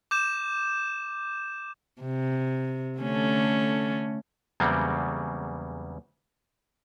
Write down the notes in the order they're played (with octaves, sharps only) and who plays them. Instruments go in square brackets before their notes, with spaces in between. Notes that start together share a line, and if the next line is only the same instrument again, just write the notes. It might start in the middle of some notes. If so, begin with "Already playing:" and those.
[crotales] D6 G6 E7
[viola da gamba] C3
D3 A3 C#4
[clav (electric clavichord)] E2 C#3 F#3 G3 A#3 C4